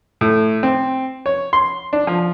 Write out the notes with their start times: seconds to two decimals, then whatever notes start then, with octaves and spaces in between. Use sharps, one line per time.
0.21 A2
0.63 C4
1.26 C#5
1.53 C6
1.93 D4
2.07 F3